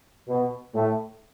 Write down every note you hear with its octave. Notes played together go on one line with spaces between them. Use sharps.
B2
A2